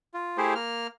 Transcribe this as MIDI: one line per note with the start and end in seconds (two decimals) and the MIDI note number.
0.14 0.37 65
0.38 0.54 57
0.38 0.54 64
0.38 0.54 67
0.38 0.54 68
0.38 0.54 72
0.55 0.87 58
0.55 0.87 89